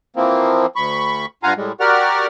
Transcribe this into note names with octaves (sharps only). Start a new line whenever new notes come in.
E3 F3 A#3 C4
D2 B5 C#6
G2 F4 F5 F#5 G#5 A#5
A2 G3 G#3
F#4 G4 A#4 D5 F#5 F6